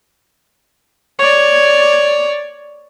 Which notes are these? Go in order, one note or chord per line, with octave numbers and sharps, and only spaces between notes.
C#5 D5